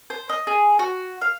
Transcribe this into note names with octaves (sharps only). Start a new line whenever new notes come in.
C5
D#5
G#4
F#4
F5